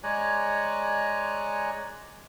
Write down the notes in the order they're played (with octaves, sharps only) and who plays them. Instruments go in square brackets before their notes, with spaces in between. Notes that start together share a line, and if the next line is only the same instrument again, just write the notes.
[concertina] G#3 C#5 D5 G#5 A#5 F#6